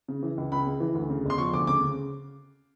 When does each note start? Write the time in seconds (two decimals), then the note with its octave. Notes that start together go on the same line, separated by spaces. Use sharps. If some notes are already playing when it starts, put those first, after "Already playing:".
0.08 C#3
0.23 E3
0.37 C#2
0.52 C#2 B5
0.67 C#3
0.80 E3
0.95 D2
1.10 C#3
1.25 E1
1.30 C6
1.38 F3 C#6
1.53 D2 D6
1.67 C#3 D6
1.83 C#3